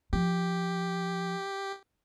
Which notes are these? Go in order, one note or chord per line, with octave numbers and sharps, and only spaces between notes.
F3 G4